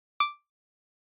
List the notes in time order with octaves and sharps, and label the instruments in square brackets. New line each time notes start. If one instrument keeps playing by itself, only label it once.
[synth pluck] D6